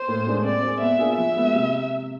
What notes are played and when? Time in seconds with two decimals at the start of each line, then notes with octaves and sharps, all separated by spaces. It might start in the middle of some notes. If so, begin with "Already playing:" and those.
Already playing: C5
0.08 A2
0.27 G#3 D4 A4
0.44 C4 D5
0.63 G#4 C5
0.81 B3 E5
0.99 D4 F4 G#4
1.17 F3 E5
1.36 G#3 B3
1.55 C3